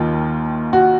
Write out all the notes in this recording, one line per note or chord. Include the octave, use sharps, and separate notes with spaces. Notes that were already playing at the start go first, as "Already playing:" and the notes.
Already playing: D#2 D#3 F4
F#4